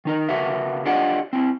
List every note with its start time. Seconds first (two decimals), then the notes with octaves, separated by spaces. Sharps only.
0.05 D#3 D#4 A#4
0.29 C#3 F#4 A#4 B4 E5
0.85 D4 F4 G4 D5 D#5 F#5
1.33 C4 E4